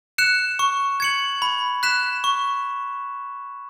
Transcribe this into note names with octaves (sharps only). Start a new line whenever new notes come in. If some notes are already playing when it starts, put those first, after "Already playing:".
F#6 C#7 E7
C#6
G#6 C#7 F#7
B5
F#6 B6 E7
C#6